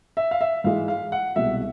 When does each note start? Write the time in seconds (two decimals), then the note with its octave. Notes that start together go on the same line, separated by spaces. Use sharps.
0.17 E5
0.31 F5
0.41 E5
0.64 G#2 E3 G#3 F5
0.88 F5
1.12 F#5
1.36 C2 B2 G#3 E5